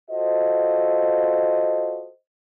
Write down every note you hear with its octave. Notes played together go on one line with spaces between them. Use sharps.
F4 F#4 A4 C5 D#5